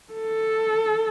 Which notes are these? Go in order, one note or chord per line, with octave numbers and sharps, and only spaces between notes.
A4